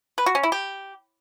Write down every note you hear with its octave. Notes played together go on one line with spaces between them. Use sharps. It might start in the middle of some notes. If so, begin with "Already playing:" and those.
B4
F#4
C#4
E4
G4